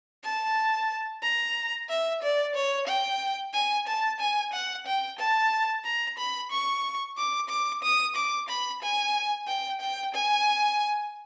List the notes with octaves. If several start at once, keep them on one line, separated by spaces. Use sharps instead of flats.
A5
A#5
E5
D5
C#5
G5
G#5
A5
G#5
F#5
G5
A5
A#5
B5
C#6
D6
D6
D#6
D6
B5
G#5
G5
G5
G#5